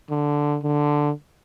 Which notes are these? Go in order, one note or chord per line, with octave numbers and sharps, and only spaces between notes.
D3
D3